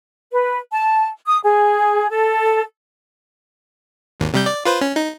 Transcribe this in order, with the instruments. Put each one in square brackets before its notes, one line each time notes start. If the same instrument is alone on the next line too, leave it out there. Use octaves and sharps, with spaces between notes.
[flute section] B4
A5
D#6
G#4
A4
[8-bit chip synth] G#1 D#2
C3 G3 G6
D5
F4 B4 C5
C#4
D#4